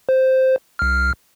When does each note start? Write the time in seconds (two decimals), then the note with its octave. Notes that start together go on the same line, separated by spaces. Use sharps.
0.09 C5
0.79 C2 F6